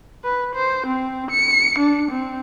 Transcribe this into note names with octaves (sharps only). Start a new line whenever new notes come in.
B4
C5
C4
C#7
D4
C4